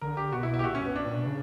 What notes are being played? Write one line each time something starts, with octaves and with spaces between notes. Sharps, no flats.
D3 A#4
G4
B2 F#4
E4
E4
G4
A#2 F#4
C#4
F#2
B3
D4
A#2
B2
C#3